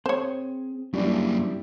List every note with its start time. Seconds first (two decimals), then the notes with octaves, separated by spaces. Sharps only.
0.06 C4 G#4 C5 C#5 G5
0.93 F#2 G3 A#3 C#4 D4 E4 G4